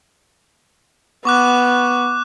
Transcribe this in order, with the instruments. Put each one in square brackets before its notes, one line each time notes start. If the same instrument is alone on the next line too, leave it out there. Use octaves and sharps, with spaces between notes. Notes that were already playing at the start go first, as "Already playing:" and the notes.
[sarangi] B3 [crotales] C#6 D6 F#6